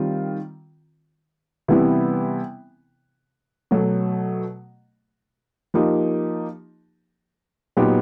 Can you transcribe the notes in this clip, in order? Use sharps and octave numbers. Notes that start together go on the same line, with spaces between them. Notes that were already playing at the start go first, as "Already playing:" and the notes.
Already playing: D#3 G3 C4 F4
C3 E3 G3 B3 E4
B2 F#3 A3
F3 A#3 D#4 G4
A#2 F#3 B3 D#4 G4